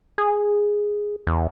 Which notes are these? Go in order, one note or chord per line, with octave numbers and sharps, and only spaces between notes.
G#4
E2